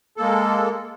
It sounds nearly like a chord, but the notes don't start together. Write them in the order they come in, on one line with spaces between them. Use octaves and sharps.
A4 A#3 G#3